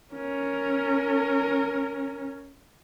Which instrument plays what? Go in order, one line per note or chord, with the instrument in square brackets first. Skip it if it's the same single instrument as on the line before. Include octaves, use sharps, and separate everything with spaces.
[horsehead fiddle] C#4 A#4